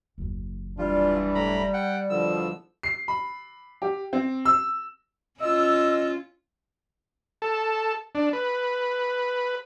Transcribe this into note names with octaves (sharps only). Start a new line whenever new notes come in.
F#1 D#2
E3 G3 D4 F4
A2 A#5 B5
F#5 G5
E2 B2 D3 F3 E6
C7
B5
G4
C4
E6
C#4 F4 D#5 E6
A4
D4
B4